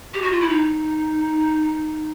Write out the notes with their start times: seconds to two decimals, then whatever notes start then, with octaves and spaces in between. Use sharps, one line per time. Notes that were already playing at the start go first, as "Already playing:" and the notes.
0.14 G4
0.22 F#4
0.32 F4
0.41 E4
0.50 D#4